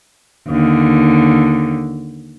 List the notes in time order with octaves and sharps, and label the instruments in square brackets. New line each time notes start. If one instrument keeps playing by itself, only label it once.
[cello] D#2 D3